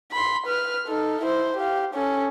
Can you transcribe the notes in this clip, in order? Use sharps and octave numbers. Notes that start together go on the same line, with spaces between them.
B5 C6
B4 F6
D#4 A4
E4 C5
G4 F5
C#4 A4